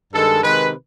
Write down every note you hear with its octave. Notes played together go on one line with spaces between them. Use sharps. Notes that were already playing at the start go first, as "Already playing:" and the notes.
G2 D#3 G#3 A4
C3 D#3 G#3 B4